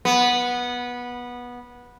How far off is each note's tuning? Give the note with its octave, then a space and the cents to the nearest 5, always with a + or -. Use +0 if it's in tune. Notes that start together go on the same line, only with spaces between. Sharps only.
B3 -15